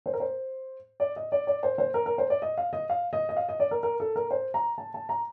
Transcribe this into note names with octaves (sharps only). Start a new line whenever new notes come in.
C5
A#4
C5
D5
D#5
D5
D5
C5
C5
A#4
A#4
C5
D5
D#5
F5
D#5
F5
D#5
D#5
F5
D#5
D5
A#4
A#4
A4
A#4
C5
A#5
A5
A5
A#5